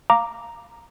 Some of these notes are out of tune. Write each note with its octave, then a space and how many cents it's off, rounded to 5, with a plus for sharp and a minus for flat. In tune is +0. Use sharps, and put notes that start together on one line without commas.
F5 +0 A#5 +0 D6 +0